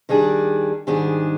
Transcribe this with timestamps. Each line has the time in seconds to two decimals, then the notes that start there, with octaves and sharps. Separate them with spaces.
0.09 D#3 G3 D4 G#4
0.87 G#2 D#3 G3 D4 G#4